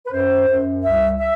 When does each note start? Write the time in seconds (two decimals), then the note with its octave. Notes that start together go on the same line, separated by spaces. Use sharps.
0.06 B4
0.12 F#2 C5
0.47 F#2
0.83 C2 E5
1.19 E5